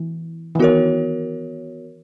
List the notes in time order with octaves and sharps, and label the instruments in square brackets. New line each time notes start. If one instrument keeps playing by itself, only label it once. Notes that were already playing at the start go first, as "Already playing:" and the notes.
Already playing: [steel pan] E3
E3
[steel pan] D#3 [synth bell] B3 F#4 A#4 C#5